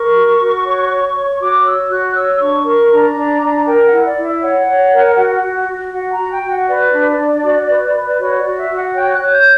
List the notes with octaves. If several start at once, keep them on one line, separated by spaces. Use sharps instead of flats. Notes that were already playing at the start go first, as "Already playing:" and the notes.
Already playing: A#4 C#6
F#4
F#4
C#5
C#5
C#5
C#6
F#4 D6
C#5 E6
F#4 F#6
C#5 E6
D4 C#6
A#4 C#6
D4 A#5
D4
D4
A#4 G5
F#5
E4
D5
E4
E5
C#5 F#5
C#5
A#4
F#4
F#4
F#4
F#4 F#5
A#5
F#4
G5
F#4
F#5
B4 D5
D4
D4
F#4
B4
B4
F#4 C#5
D5
F#4
E5
F#4
F#5
C#5 G5
F#6
C#5
G6